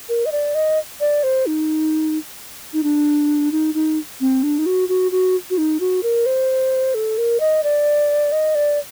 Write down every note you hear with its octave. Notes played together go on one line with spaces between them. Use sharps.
A#4
D#5
D5
D#5
D5
C5
D#4
D#4
D4
D#4
D#4
C4
D4
D#4
F#4
F#4
F#4
F#4
D#4
F#4
A#4
C5
A4
A#4
D#5
D5
D#5
D5